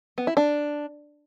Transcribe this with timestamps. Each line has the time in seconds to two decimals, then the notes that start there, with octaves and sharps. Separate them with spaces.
0.18 B3
0.27 E4
0.37 D4